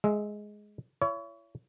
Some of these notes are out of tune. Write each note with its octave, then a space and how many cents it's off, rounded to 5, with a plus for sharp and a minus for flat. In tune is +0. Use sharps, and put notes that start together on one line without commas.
G#3 +5 E5 -10
E4 +35 C#5 +30